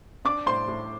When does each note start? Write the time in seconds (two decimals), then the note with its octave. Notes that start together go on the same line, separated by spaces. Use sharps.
0.25 D4 D5 D6
0.46 A2 C5 C6
0.68 A2